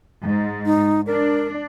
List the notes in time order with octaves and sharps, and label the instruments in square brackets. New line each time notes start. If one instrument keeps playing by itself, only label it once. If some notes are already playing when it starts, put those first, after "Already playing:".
[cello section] G#2
[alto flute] D#4
[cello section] D4 [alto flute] A#4